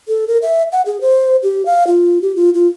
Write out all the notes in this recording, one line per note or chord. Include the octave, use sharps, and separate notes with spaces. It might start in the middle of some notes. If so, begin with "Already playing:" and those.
A4
A#4
E5
F#5
G#4
C5
G4
F5
F4
G4
F4
F4